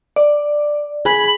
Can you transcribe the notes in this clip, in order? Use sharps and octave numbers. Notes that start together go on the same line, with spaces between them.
D5
G#4 B5